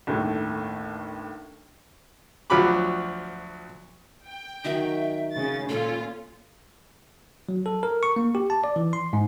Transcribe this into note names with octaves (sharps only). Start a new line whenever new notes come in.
G1 D#2 A2
D2 F3 F#3 B5 D6
G5
D#3 F#3 D#4 E5
C#3 A6
A#2 C#4 F4 A4
F#3
A4
A#4
C#6
A#3
G4
A5
D5
E3
C6
G#2